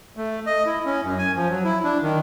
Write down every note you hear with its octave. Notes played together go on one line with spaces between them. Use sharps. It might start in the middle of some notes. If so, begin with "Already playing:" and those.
A3
D#5
E4
C#4
F#2
G#5
F3
F#3
E4
D4
D#3